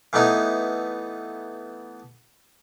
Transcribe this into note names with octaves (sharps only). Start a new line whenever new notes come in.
E3 A3 B3 D#4 E4